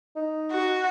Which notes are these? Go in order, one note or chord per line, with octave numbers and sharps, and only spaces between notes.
D#4
F#4